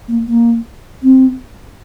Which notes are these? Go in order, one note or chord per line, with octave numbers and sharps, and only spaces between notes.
A#3
A#3
C4